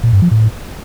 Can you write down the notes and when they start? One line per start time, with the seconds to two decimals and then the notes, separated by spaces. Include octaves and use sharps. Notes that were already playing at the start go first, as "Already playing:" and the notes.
0.03 A#2
0.13 G2
0.22 F3
0.31 A2